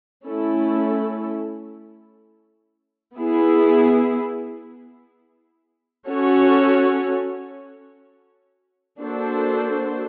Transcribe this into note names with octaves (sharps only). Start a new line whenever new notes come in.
A3 C#4 E4 A4
B3 E4 G#4
C#4 F#4 A4 C#5
A#3 D4 F#4 A4 C5